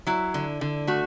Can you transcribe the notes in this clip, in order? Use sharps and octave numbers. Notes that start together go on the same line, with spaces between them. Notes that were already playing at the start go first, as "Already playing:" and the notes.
F#3 E4
D3
D3
A3 F#4